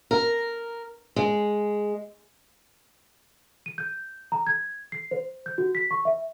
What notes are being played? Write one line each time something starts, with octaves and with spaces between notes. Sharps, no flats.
A#4
G#3
D#7
G6
A#5
G#6
C7
C5
G6
F#4
B6
C#6
E5